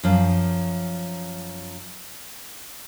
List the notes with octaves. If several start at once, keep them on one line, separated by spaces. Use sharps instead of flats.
F#2 F3